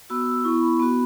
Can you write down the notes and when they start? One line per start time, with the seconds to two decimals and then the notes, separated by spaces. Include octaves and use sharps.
0.10 B3 F#4 E6
0.27 E6
0.44 B3 E4 C#6
0.61 B5
0.79 B3 F#4 B5